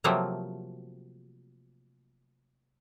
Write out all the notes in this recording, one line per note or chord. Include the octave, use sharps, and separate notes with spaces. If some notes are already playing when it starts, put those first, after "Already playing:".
C3 F3 F#3 A3 A#3 C4